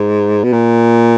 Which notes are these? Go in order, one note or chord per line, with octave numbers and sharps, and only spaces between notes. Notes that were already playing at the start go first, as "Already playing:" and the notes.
Already playing: G#2
B2
A#2